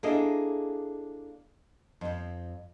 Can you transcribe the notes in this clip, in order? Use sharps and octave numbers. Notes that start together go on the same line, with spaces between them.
A#3 D4 E4 G#4 A4 D#5
F2 C4